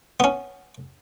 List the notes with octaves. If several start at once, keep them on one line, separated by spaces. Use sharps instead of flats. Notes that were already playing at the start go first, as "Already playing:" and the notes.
B3 C#4